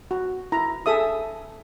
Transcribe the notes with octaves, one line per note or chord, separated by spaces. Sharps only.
F#4
E4 A#5
G#4 A4 E5 D#6